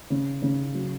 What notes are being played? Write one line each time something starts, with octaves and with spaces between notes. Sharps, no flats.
C#3
C#3
F#3